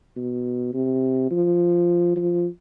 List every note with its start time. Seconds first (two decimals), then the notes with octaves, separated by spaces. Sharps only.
0.17 B2
0.74 C3
1.31 F3
2.16 F3